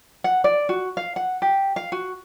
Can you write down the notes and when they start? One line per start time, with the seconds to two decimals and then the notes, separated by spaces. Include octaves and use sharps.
0.24 F#5
0.44 D5
0.69 F#4
0.97 F5
1.16 F#5
1.42 G4
1.76 F5
1.92 F#4